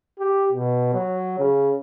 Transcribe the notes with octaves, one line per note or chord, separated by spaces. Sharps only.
G4
B2
F#3
C#3